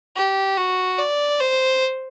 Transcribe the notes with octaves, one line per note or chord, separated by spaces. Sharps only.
G4
F#4
D5
C5